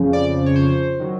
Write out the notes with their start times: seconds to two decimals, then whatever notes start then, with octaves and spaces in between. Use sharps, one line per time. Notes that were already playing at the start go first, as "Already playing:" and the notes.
Already playing: F2 C#3 F3
0.13 D5
0.46 C#5
0.56 C5
1.00 D#3 F#3